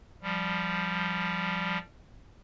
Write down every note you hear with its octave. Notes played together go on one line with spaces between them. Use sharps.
F3 G3